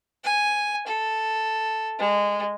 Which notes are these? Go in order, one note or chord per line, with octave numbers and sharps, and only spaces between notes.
G#5
A4
G#3